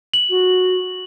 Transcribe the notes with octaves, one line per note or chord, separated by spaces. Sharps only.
F#7
F#4